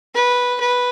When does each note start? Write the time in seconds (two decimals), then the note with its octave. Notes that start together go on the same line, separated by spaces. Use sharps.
0.15 B4
0.60 B4